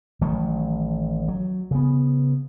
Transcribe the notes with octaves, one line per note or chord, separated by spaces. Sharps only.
A1 D#3 F#3 A3
F#3
C#3 B3